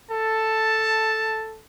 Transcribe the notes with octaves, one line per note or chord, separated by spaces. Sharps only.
A4 A5